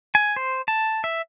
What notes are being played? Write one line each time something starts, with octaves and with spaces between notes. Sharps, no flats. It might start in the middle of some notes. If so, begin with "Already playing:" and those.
G#5
C5
A5
E5